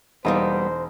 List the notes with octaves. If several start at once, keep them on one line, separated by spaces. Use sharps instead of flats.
E1 G3 A#3 B3 D#4 C5